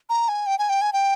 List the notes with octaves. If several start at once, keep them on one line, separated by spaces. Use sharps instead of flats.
A#5
G#5
G5
G#5
G5
G#5
G5